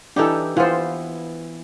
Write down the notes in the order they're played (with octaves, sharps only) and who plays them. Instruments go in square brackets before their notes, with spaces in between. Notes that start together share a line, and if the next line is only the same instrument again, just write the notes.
[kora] E3 D#4 G4 [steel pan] D4 A4
[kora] E3 B3 [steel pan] F4 C5